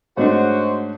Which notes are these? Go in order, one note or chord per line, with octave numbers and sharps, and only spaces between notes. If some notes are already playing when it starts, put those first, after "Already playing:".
G#2 A3 D4 F#4 C5 C#5 D#5 F#5